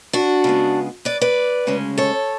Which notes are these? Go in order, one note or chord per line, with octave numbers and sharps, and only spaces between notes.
D4 F#4
C#3 G#3 B3
B4 D5
B4 D5
D2 C#3 G#3 C#4
A4 C#5